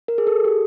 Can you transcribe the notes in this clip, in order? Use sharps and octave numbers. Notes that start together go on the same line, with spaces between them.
A#4
G#4
A4
G4